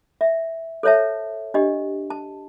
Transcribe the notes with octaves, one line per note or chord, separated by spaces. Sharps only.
E5
A4 C5 C#5 E5 A5
D4 G4 D#5
A5